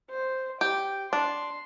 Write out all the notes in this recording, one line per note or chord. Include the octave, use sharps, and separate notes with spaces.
C5
G4 G5
D4 C6